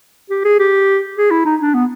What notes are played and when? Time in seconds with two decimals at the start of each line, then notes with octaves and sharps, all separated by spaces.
0.30 G4
0.45 G#4
0.59 G4
1.18 G#4
1.31 E4
1.45 D#4
1.61 D4
1.74 B3